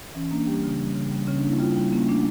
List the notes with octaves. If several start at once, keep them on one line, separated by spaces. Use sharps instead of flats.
E3 C#4
A#3 D4
G3 G4
C#3
G3
C#3
G3
C#3 C#4
D4
A#3 E4
G3 F4
G3 E4
A#3 C#4
A3 D4